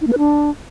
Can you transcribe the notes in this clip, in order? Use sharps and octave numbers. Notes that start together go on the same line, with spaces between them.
D#4
A#3
B4
D4